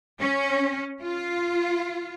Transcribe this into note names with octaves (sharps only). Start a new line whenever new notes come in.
C#4
F4